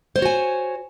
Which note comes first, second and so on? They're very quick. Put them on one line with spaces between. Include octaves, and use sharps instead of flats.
C5 C#5 F#4 G#5